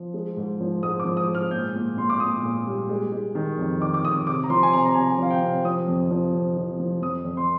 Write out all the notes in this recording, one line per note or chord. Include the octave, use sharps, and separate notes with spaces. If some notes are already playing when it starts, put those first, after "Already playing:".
Already playing: F3
G#3
G#2
F3
G#2 D#6
D6
F3
D#6
G#2
F6
A#2 G6
A#2
A#2 C6
D6
A#2 D#6
A#2
G3
G#3
G#3
D#3
F2
D#3 D6
D6
F2 D#6
C3 D6
A#5
F3 C6
G#5
C3 A#5
A#5
C3 G#5
F3 F5
G5
C3
F3 D#6
F2
F3
F2
F3
F3
F2 D#6
F2
C6